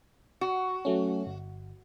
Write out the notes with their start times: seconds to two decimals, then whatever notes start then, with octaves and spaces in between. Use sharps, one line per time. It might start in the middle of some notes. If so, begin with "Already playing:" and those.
0.41 F#4
0.85 F#3 A3 C#4
1.26 G1